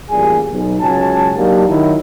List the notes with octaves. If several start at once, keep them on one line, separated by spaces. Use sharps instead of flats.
A1 A#2 G3 G#4 G#5
B1
C#2 F#3 G#5 A5
F#3 A#3 D4 D#4 G4
D#3 F#3 E4